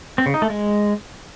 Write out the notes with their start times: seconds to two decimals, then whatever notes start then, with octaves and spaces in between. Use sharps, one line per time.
0.18 C4
0.26 C#3
0.34 D#4
0.42 A3
0.50 G#3